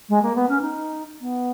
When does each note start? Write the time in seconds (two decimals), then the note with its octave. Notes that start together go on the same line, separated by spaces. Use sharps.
0.09 G#3
0.22 A#3
0.36 B3
0.49 C#4
0.62 D#4
1.21 B3